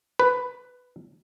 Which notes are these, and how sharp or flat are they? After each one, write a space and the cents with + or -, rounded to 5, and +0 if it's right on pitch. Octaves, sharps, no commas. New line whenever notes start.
B4 +10